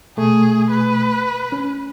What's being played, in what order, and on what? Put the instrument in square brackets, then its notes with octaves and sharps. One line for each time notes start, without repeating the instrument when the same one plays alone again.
[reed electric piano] B2 A3 [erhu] G#4
[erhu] B4
[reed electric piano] C#4